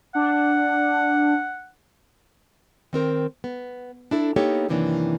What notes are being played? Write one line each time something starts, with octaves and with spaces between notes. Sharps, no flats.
D4 F#5
D#3 C4 A#4 C5
B3
D4 E4 A4
A#3 B3 D#4 G4 A4 C#5
F#2 C3 D#3 E3 A#3 D4